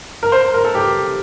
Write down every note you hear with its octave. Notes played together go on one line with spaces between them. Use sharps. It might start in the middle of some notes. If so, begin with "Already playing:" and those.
A#4
C5
A#4
A4
G4